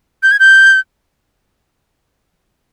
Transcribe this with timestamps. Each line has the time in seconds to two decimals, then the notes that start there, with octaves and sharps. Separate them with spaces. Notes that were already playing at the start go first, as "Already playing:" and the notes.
0.23 G6
0.32 G#6
0.40 G6